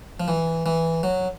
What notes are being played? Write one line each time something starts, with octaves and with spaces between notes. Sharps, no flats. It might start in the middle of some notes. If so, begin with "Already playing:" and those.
F3
E3
E3
F#3